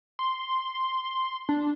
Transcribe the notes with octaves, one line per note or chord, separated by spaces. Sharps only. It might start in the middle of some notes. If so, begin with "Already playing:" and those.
C6
D4